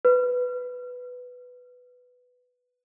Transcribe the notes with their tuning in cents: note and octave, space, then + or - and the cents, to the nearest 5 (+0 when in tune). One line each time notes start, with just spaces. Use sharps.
B4 +5